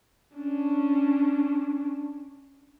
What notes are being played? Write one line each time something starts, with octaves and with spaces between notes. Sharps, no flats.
C#4 D4